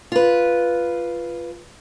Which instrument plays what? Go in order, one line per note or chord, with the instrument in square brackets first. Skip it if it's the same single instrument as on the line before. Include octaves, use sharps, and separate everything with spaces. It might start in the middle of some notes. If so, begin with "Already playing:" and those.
[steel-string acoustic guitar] F4 B4